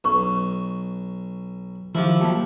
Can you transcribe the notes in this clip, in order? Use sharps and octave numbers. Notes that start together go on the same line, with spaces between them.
B1 C#4 B4 C#6
D#3 F3 E4 G4
F#3 A#3 G5 A5 B5